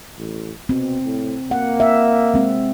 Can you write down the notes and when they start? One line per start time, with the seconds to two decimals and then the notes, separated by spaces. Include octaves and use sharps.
0.18 A1
0.69 B2 C4
1.05 A2
1.51 A#3 F#5
1.80 E5
2.34 G#3 C4